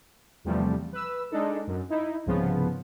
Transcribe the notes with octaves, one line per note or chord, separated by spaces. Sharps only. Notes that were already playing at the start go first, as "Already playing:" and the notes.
E2 C3 F3 G3 A3
B4 E6
G#3 D4 D#4 A4
F#2
D#4 E4
C2 G#2 C#3 F3 B3